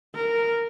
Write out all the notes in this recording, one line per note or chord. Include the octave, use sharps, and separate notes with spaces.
A#4